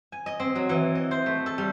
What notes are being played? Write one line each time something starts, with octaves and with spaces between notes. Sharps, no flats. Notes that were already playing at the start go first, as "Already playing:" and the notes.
G#5
D#5
C4
F#3
E3
D#5
C5
A3
A4
G3